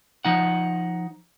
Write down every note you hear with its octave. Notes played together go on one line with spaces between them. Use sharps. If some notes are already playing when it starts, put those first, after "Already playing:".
F3 D#4 F#5